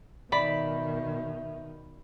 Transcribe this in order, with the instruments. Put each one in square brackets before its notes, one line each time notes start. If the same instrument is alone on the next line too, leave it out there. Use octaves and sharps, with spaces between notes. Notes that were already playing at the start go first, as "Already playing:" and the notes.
[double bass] B2 D#3 [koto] D5 [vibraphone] E5 [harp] B5